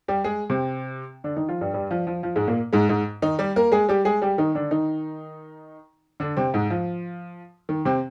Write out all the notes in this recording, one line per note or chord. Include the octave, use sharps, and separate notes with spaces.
G3 G4
G#3 G#4
C3 C4
D3 D4
D#3 D#4
F3 F4
G2 G3
G2 G3
F3
F3
F3
G#2 G#3
A#2 A#3
G#2 G#3
G#2 G#3
D#3 D#4
G3 G4
A#3 A#4
G#3 G#4
G3 G4
G#3 G#4
G3 G4
D#3 D#4
D3 D4
D#3 D#4
D3 D4
C3 C4
G#2 G#3
F3
D#3
C3 C4